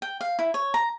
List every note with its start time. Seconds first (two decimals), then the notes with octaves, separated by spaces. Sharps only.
0.02 G5
0.21 F5
0.39 E4
0.54 C#5
0.74 A#5